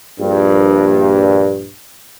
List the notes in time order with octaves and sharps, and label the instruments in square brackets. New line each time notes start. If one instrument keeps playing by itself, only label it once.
[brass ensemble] A#1 G2